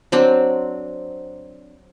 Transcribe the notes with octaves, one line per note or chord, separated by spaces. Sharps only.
F#3 C4 D4